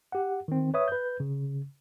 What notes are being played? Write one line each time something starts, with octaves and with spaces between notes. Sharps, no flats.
G4 F#5
D#3 C4
B4 C#5 E5 D#6
B4 G6
C#3